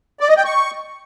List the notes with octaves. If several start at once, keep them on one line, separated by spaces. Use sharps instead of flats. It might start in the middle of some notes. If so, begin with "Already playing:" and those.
D5
D#5
G5
C#6